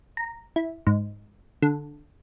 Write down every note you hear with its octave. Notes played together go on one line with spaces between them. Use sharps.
A#5
E4
G#2
D3